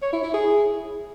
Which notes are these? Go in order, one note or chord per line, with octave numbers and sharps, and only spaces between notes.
C#5
E4
E4
G#4